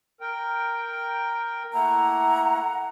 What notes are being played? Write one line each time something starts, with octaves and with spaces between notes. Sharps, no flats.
A#4 G5
A3 A#3 E4 F#5 A#5